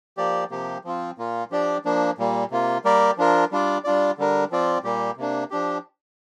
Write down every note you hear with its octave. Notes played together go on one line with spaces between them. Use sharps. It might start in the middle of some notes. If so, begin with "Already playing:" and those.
F3 A#3 G4 D5
C3 F3 A#3 G4
F3 C4 F4
A#2 A#3 F4
F3 D4 G4 D5
F3 A#3 D4
A#2 G3 A#3
C3 A#3 F4
G3 A#3 G4 A#4 D5
F3 D4 F4 A#4
G3 D4 F4 D5
G3 D4 F4 D5
D3 G3 D4 A#4
F3 C4 F4 D5
A#2 G3 A#3 G4
C3 A#3 D4
F3 D4 G4